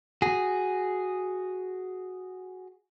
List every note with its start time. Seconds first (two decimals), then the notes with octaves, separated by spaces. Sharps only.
0.22 F#4 G#4